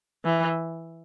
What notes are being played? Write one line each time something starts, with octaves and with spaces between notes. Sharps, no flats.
E3